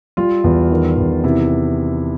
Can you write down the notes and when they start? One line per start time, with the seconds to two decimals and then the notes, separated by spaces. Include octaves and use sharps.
0.17 G3 F4
0.44 E2
0.71 D#3
0.98 E2
1.24 C3 E4